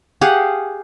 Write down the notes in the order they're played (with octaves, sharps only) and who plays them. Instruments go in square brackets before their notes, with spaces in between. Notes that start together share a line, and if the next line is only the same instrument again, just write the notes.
[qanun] G4 G#4 F5 F#5